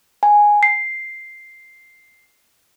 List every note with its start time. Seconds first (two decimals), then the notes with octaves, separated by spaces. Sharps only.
0.23 G#5
0.63 C7